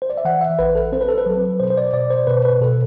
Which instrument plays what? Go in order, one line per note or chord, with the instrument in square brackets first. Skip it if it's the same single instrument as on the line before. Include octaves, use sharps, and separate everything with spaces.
[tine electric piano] C5
D5
E5
E3 F#5
E5
A1 B4
A4
C4 C5
B4
A4
B4
F#3
B2 C5
C5
D5
B2 D5
C5
B2 B4
B4
B2 A4